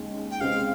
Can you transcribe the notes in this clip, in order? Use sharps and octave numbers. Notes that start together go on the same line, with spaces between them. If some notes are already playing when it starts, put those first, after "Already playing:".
Already playing: D#2 C#3 G#3 C#4
G5
C#3 G#3 C4 F5